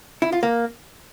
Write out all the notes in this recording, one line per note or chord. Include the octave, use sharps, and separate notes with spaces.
E4
F4
A#3